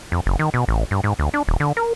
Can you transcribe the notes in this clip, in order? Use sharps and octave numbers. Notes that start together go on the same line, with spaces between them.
F2
F#1
D#3
B2
A1
G2
G#2
D2
D4
D#1
D3
A#4